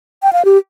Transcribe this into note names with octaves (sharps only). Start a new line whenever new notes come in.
G5
F5
G4